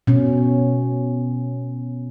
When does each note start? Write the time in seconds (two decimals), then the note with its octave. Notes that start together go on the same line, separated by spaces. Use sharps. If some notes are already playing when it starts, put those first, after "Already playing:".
0.07 B2 C#4